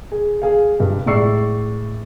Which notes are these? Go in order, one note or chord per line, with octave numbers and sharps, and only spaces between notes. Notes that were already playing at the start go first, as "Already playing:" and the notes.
G#4
G#4 F5
G2
A2 G#3 D5 C#6 E6 C7